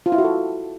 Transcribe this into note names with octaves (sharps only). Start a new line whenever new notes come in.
F4
E4
F#4
A4